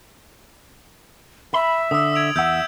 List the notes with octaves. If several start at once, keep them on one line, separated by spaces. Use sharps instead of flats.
E5 B5
D3 D#6 E6
G#6 D7 F7
E2 E5 F#5 E6 G6